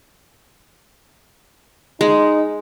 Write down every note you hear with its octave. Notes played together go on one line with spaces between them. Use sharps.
G#3 D#4